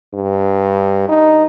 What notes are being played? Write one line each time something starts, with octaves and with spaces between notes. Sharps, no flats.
G2
D#4